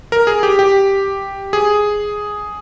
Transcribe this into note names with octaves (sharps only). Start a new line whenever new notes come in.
A#4
G#4
G4
G4
G#4